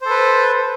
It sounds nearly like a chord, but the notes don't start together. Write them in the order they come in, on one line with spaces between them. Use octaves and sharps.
C5 A4 B4